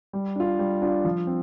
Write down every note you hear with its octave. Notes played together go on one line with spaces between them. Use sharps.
G3
D4 F4
G3
D4 F4
F3
C4